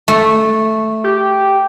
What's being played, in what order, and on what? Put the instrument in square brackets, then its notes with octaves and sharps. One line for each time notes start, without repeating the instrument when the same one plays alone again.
[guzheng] A3
[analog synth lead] G4